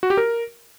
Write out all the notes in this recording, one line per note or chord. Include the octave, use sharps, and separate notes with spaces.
F#4
G4
A#4